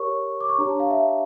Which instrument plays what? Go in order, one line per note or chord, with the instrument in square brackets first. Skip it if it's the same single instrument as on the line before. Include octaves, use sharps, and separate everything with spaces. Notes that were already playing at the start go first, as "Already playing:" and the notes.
Already playing: [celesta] G4 A#4 C#5 C#6
D6
C#6
D4 G4 C#5 A#5
A5
F5
E5